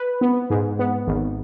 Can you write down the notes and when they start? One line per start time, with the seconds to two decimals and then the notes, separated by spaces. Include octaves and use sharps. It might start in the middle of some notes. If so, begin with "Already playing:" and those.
Already playing: B4
0.21 B3
0.50 G#2
0.79 B3
1.07 G#1